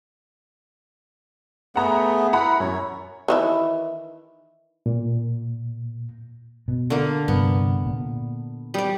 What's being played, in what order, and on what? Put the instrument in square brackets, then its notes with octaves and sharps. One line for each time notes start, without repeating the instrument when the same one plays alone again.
[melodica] A3 B3 G#4 [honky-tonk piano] F#5 A#5
[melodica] E4 [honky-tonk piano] F#5 A#5 B5
[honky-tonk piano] F#2 [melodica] C#5
[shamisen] D#3 E3 E4
[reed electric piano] A#2
[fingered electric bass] B2
[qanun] D3 A#3
[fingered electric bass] G2 C3 [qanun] B3
[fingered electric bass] A#2
[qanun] G3 D5